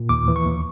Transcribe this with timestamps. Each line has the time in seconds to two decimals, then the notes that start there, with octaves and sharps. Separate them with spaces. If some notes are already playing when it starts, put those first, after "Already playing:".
Already playing: A#2
0.09 D#2 D6
0.28 E3
0.36 C#6
0.46 D#2